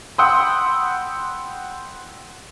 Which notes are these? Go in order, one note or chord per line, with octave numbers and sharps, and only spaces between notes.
F#5 G5 B5 C6 D#6 E6